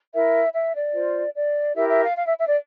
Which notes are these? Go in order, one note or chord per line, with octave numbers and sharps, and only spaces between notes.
E4 A#4 E5
E5
D5
F4 C5
D5
E4 G4 A#4 E5
E5
F5
F5
E5
E5
D5